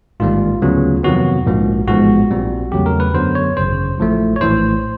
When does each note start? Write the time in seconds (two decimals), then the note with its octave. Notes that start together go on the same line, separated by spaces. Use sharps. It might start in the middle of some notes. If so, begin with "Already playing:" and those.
0.20 A1 G#2 D#3 G3 A#3 F4
0.62 D2 C#3 F#3 B3
1.03 F2 C3 D#3 F#3 B3 F#4
1.46 A#1 G#2 F3 A#3
1.88 A1 G#2 F3 G#3 B3 F#4
2.31 A#1 A#2 G3 C4
2.72 E2 C#3 F#3 A3 G4
2.86 A#4
3.00 B4
3.14 F#2 D3 F#3 B3 C5
3.35 C#5
3.56 G#1 F#2 C#3 C5
3.99 A1 A2 F3 A3
4.36 C#5
4.41 A#1 A2 E3 C5